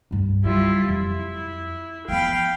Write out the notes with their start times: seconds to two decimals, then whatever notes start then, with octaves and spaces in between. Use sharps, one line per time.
0.11 C2 G2
0.45 C#3 F#3 G3 E4 F4
0.88 F2 E4
2.08 F3 B3 F5 G5 B5